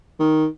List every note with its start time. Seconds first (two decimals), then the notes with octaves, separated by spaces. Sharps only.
0.20 D#3